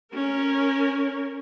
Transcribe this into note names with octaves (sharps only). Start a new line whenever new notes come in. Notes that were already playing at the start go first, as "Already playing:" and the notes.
C#4 A#4